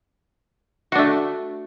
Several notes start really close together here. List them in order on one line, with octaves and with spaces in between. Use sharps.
F#4 D4 A3